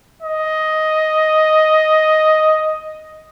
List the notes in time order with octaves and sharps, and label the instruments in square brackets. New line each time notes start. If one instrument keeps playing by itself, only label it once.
[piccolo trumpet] D#5